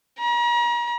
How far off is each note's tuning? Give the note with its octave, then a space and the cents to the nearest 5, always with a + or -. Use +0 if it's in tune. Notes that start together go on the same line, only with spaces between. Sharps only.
A#5 +40